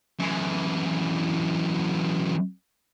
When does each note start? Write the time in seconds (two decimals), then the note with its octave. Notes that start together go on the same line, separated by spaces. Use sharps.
0.19 F#2 E3